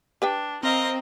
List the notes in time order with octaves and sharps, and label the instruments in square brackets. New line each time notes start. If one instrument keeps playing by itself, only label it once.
[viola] D4 [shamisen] G4 B4 G5
[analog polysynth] C4 [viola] A#4 F5 [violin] D#5